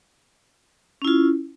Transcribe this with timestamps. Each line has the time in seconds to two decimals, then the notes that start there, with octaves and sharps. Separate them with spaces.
1.02 C#4
1.05 E4
1.07 F4